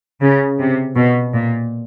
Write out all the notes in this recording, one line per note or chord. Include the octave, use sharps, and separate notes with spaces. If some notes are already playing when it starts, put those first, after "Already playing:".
C#3
C3
B2
A#2